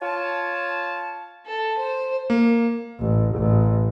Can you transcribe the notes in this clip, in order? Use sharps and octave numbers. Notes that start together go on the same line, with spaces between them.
F4 C#5 A5
A4
C5
A#3
A1
A1